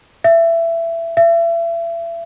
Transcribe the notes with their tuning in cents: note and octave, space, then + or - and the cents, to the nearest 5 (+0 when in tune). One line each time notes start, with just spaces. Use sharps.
E5 +20
E5 +35